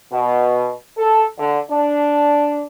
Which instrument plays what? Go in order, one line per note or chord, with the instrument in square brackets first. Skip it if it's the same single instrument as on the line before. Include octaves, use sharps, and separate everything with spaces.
[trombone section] B2
A4
D3
D4